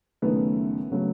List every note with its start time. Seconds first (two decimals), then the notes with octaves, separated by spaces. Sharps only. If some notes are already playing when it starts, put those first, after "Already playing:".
0.22 F#1 F#2 D#3 A3 B3
0.91 C#3 F#3 A3